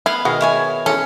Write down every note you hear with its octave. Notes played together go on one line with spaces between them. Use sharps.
B3 E4 F5
B2 D#3 F#4 G#4 D#5
E4 C#5 G#5
E3 G#3 C#4 A4